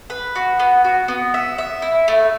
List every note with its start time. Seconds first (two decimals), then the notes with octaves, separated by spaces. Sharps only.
0.10 B4
0.35 F#4
0.60 B3
0.84 F#4
1.08 B3
1.34 E5
1.58 E5
1.82 E4
2.08 A3